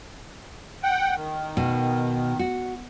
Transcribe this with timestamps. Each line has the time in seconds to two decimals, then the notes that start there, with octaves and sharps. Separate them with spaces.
0.83 F#5 G5
1.16 D#3
1.57 B2
2.39 F#4